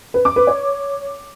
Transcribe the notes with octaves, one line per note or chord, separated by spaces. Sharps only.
B4
D6
B4
C#5